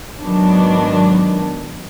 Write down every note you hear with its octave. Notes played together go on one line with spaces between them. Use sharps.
G#2 D#3 F#3 B3 D4